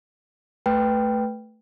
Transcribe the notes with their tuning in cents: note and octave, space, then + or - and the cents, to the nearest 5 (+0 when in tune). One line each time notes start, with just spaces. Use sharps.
A3 +0 B4 +0 G5 +0